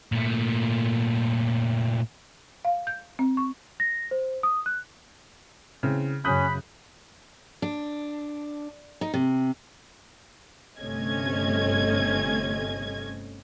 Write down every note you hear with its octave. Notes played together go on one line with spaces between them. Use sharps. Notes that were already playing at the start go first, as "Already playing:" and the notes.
A#2 A3
F5
G6
C4
C#6
A#6
C5
D#6
F#6
C#3 E3 C4
F#2 C#3 C#4 B5 D#6 F#6 G6
D4
D#4
C3
G1 C3 A3 C#4 D#5 G#6